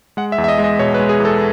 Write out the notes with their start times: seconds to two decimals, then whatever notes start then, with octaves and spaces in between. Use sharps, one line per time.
0.17 G#3 F#5
0.32 E5
0.38 E2
0.44 E5
0.48 D#5
0.58 G#3
0.64 D#5
0.79 B2 C#5
0.94 B4
0.99 G#3
1.09 G#4
1.20 E2 A4